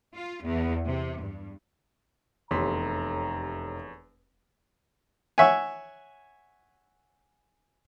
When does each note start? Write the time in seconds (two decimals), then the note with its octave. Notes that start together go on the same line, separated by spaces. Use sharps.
0.15 F4
0.46 E2
0.86 C3
1.20 G2
2.51 F1 E2 G4 A4 C#5 A#5 C6 B6
5.38 C#5 E5 F#5 G#5